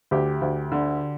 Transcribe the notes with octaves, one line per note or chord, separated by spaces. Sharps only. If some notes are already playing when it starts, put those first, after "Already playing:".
D2 G4
D2
D3